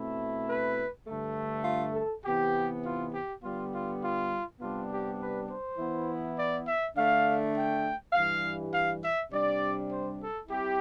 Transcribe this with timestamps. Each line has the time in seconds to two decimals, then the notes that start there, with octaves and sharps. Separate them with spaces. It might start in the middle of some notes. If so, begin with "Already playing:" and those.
Already playing: B2 A3 C4 E4
0.47 B4
1.07 G2 D3 A3
1.65 F4
1.94 A4
2.24 C3 E3 B3 G4
2.84 F4
3.12 G4
3.42 D3 G3 B3 F4
3.71 F4
4.01 F4
4.59 C3 G3 B3 D4 F4
4.89 G4
5.19 B4
5.48 C5
5.78 E3 B3 E4
6.36 D5
6.66 E5
6.95 D3 A3 D4 F5
7.53 G5
8.13 G2 E3 G3 F5
8.71 F5
9.01 E5
9.30 C3 G3 D4 D5
9.89 C5
10.19 A4
10.48 G3 C4 E4 G4